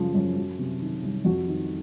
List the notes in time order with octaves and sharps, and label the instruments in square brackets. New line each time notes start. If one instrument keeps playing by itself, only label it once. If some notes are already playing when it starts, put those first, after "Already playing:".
Already playing: [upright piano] F#2 C#3 F3
F#2
F#3
C3
D#3
C2
F2 F#4
D#3